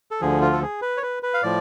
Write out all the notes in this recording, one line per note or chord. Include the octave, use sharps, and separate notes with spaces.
A4
D2 D3 F3 G#4
F4
A4
G#4
B4
C#5
B4
B4
F5
A2 F3 D5